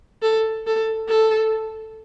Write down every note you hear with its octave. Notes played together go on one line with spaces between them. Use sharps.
A4
A4
A4